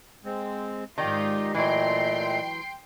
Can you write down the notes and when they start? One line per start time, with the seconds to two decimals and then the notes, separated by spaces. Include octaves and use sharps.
0.25 G#3 C4
0.98 G#2 D#3 D#4 F4 G4 D5 D#5 G5
1.55 A#2 E3 F#3 A3 D#5 G5 C6